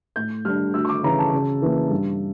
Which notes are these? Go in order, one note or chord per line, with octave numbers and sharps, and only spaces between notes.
A2 G6
G3 D4 F6
D2 E6
C#6
D6
C#3 E3 A#5
A5
C#3
E3 A#3
G2